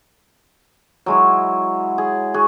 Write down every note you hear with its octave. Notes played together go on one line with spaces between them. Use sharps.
F#3 G#3 E4
G#4
F#4 G#4